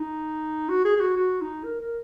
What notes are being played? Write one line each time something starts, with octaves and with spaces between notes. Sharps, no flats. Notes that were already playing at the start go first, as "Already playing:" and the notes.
Already playing: D#4
F#4
G#4
G#4
F#4
F#4
D#4
A#4
A#4